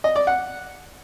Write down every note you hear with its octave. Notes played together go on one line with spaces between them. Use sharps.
D#5
D5
F#5